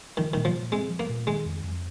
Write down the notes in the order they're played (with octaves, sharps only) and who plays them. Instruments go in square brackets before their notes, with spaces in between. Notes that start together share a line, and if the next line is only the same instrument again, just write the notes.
[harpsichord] D#3 [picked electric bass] F3
[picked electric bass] A#2 [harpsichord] D#3
[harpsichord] F3
[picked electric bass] A#2
[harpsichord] G#3 [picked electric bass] C4
[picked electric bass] F3
[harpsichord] A#3
[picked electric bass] A#2
[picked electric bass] D#3 [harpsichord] G#3
[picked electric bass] F2
F2